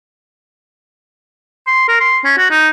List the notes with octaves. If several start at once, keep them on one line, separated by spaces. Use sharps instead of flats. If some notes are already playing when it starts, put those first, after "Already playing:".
C6
A#4
C6
C#4
F#4
D#4